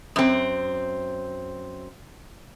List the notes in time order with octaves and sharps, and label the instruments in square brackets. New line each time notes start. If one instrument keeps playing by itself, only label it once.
[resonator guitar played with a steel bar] F#2 C4